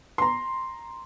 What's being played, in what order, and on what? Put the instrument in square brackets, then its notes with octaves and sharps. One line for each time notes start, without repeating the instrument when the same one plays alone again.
[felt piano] A#5 C6